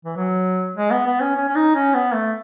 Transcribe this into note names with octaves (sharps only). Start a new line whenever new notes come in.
E3
F#3
G#3
B3
B3
C#4
C#4
C#4
D#4
C#4
B3
A3